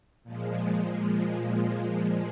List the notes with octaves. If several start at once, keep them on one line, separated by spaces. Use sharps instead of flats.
A#2 F3 G#3